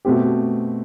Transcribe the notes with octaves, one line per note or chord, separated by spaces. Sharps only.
B2 A3 C4 G4